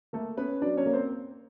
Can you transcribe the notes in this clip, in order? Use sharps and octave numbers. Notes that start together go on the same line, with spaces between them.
A3 A#3 A4
B3 C#4 B4
F#3 D4 D5
C#4 C#5
A#3
C4 C5